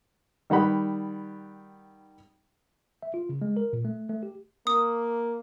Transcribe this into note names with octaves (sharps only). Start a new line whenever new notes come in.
D#3 G3 F#5 B5
E5
F4
C#3
G#3
A#4
A#2
A3
A3
G4
A#3 D#6